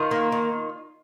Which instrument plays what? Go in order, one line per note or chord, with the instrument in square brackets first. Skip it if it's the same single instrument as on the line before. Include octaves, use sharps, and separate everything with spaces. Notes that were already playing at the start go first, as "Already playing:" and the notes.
Already playing: [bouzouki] D#3 F4
A#3
D#3